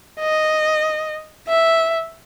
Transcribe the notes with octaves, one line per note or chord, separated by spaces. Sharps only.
D#5
E5